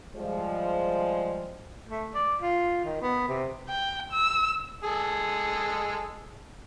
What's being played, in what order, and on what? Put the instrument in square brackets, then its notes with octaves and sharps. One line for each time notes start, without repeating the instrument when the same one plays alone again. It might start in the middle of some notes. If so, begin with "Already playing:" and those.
[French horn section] F3 G3 G#3
[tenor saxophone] A3
D5
F4
D#3
B3
C3
[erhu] G5
E6
[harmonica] G#3 G#4 A4